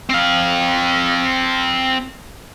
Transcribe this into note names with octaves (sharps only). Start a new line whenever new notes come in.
C4 F5